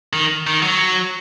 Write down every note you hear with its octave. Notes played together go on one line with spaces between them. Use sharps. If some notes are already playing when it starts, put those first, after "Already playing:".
D#3
D#3
F#3